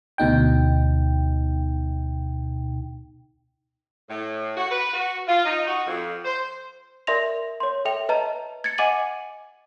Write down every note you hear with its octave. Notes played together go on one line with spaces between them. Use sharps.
D2 B2 D#4 G5
A2
F#4
B4
F#4
F4
D#4
F#4
F2
C5
A#4 D5 E5 C6 A#6 F7
C#5 C6
A4 E5 G5 F7
B4 D#5 A5 A#5
G#6 A6 C#7
D#5 F#5 G#5 D6 D#7 F#7